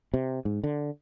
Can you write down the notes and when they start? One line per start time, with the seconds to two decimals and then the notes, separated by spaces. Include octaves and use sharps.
0.14 C3
0.45 G#2
0.64 D3